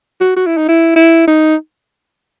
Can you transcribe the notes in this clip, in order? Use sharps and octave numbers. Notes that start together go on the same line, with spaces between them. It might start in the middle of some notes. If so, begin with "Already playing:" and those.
F#4
F#4
E4
D#4
E4
E4
D#4